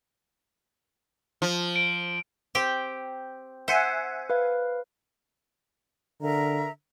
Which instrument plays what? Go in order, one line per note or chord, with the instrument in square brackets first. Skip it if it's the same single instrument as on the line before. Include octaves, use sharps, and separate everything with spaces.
[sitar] F3
[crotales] D7
[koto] C4 G4 G5
[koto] C5 [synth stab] E5 F#5 G#5
[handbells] B4 F5
[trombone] D3 [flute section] A#4 E5 A#5